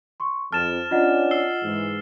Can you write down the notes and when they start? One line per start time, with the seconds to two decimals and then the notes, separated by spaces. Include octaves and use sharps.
0.20 C6 C#6
0.52 F2 A5 F6 A6 E7
0.91 C#4 D4 F4 D#5 F#5
1.31 E6 C7 G7
1.63 G#2 E3